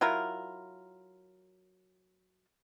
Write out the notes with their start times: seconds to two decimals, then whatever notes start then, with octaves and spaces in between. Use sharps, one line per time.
0.01 F#3 E4 F4 A#4